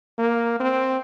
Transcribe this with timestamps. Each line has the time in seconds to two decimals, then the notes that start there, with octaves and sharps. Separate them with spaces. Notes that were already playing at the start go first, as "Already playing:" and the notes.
0.19 A#3
0.60 C4